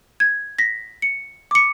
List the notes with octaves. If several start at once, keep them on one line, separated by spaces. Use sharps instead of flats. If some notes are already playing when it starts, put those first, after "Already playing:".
G#6
A#6 B6
C#7
D6 C#7